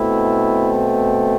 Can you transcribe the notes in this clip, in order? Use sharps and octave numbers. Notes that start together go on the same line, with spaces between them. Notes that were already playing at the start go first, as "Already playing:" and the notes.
Already playing: B2 A3 C4 E4